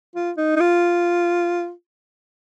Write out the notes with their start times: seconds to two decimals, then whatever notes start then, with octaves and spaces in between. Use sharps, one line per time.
0.15 F4
0.37 D#4
0.56 D#4
0.60 F4